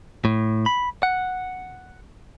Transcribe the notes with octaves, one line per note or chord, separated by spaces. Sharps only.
A2
B5
F#5